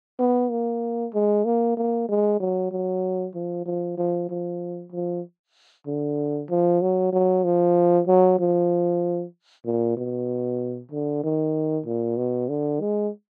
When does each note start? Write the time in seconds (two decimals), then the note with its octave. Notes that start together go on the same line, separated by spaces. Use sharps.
0.19 B3
0.51 A#3
1.14 G#3
1.45 A#3
1.77 A#3
2.09 G#3
2.40 F#3
2.72 F#3
3.35 F3
3.66 F3
3.98 F3
4.30 F3
4.93 F3
5.87 D3
6.50 F3
6.82 F#3
7.13 F#3
7.44 F3
8.07 F#3
8.40 F3
9.65 A#2
9.97 B2
10.92 D3
11.24 D#3
11.86 A#2
12.17 B2
12.49 D3
12.81 G#3